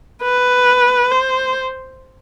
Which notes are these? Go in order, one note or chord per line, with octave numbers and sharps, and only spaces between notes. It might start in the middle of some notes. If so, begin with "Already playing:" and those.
B4
C5